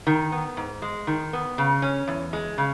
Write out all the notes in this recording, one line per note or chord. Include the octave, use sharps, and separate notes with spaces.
D#3
B3
G#2
G#3
D#3
B3
C#3
C#4
E2
G#3
C#3